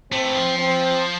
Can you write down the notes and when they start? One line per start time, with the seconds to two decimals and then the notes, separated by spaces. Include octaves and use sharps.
0.12 A3 C4
0.24 E3
0.36 F3
0.59 C4